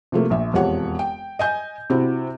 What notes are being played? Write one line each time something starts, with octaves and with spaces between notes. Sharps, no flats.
C3 F3 A3 A#3
A#1 E5
E1 F2 F3 G4 C#5 F#5
G5
D#5 G#5 G6
C3 C4 E4 F#4